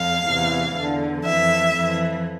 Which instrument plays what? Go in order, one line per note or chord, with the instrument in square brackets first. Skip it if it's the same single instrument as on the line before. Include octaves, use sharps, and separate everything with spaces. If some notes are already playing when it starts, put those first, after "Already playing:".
Already playing: [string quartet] F2 F5
E2 C3 E3
E2 D3
F2 E3 E5
F2 E3